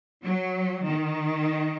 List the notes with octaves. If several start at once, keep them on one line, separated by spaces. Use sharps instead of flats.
F#3
D#3